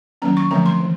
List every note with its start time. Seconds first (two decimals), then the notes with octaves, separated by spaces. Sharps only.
0.22 D#3 F#3 A#3 C#4 A#5
0.37 C#6
0.51 D3 F3 A3 C4 A#5
0.66 C6
0.80 E3